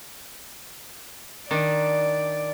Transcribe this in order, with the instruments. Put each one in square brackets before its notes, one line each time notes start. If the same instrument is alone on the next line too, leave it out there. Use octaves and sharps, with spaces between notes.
[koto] D#3 D4 [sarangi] D5